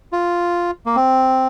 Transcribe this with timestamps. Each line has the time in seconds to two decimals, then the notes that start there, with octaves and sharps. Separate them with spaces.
0.12 F4
0.86 A#3
0.96 C4